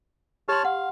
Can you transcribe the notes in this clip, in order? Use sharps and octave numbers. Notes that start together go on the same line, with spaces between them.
G4 C#5 A5 C6 F6
F5 F#5